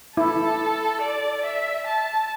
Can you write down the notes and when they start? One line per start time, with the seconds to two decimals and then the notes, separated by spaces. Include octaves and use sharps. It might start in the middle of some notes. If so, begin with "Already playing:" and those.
0.17 E4 A4
1.01 D5
1.44 E5
1.87 A5